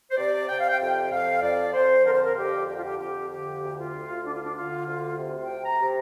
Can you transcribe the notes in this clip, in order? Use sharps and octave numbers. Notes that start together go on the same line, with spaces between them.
C5
C3 D5
C3 G5
F5
G5
F2 G5
F2 F5
F2 D5
F2 C5
D3 A#4
C5
A#4
F2 G4
D3 G4
F4
G4
F2 G4
D3 G4
D2
F4
D2
D3 D4
F4
D4
D3 F4
D2 F4
C3
G5
C3
A#5
C3